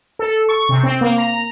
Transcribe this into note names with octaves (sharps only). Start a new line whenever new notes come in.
A4
C#6
C3
C4
A#3
A#5